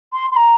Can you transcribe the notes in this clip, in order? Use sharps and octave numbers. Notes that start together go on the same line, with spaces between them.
C6
C6
A#5